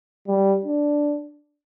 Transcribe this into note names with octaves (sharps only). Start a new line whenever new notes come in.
G3
D4